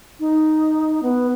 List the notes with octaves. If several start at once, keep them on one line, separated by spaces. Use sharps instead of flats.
D#4
B3